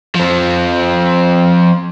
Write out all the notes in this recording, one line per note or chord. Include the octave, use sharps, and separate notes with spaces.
F3 C4